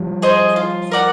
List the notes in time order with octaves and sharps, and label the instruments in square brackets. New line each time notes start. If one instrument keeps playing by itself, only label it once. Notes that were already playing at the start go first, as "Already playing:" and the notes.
Already playing: [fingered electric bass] F3 G3
[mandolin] G#4 C5 D#5
F4
A#4 D5 F#5